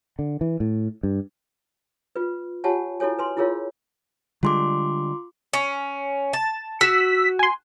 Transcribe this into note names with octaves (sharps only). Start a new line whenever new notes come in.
D3
E3
A2
G2
F4 B4
F4 G4 C#5 F#5 G#5 A5
E4 F#4 A4 C#5 G#5
B4 G#5 C6
E4 F4 G#4 A#4 C#5 F5
D3 G3 G#3 F4 C6 D6
C#4
A5
F#4 E6 B6
G#5 C6